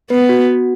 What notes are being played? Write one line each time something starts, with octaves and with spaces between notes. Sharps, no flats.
B3 B4
F#4